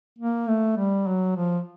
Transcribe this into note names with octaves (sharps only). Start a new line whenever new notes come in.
A#3
A3
G3
F#3
F3